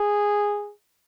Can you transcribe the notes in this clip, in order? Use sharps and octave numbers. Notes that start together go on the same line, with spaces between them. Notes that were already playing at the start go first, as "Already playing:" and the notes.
Already playing: G#4